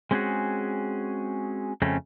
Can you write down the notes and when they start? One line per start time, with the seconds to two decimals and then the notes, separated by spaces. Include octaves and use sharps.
0.11 G#3 C4 C#4 E4 F#4 G#4
1.82 F2 C#3 A3 C4 C#4